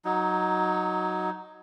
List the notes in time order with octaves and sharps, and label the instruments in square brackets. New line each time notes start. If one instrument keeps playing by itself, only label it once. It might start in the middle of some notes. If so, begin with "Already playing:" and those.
[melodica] F#3 D#4